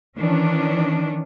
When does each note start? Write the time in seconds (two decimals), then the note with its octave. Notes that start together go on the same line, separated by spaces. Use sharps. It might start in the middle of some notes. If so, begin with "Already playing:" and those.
0.16 D#3 E3 C#4 D4